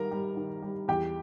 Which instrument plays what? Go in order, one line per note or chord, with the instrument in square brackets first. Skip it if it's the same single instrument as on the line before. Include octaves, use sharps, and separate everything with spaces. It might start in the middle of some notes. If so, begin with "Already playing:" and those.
Already playing: [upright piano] D#3 G3 A#4 A#5
G3
D#3
G3
E2 G4 G5